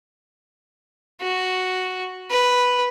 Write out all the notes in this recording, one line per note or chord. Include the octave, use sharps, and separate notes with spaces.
F#4
B4